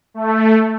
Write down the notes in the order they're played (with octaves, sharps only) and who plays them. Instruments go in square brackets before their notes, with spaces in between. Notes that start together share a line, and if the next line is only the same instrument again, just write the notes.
[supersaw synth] A3